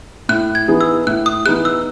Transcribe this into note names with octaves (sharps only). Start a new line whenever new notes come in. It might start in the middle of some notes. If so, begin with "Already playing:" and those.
A2 F#6
G#6
E3 B3 D#4 G#4
E6
A2 F#6
D#6
E3 B3 D#4 G#4 F#6
E6